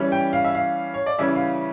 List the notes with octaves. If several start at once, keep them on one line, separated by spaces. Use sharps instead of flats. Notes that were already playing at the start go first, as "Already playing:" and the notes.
Already playing: E3 G3 C#4
G5
F5
E5
F5
C#5
D5
C#3 E3 G3 C#4 E4 E5
F5